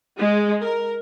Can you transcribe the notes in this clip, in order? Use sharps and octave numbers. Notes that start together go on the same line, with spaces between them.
G#3
A#4